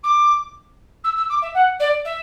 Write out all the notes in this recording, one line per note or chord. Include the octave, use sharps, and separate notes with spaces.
D6
E6
E6
D6
E5
F#5
D5
E5